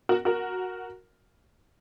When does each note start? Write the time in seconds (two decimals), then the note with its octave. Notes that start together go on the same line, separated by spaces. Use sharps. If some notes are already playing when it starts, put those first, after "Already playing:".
0.09 F#4 A#4
0.25 F#4 A#4